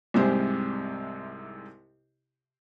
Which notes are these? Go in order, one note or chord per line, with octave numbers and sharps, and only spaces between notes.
C2 G#2 C3 G#3 G4 C5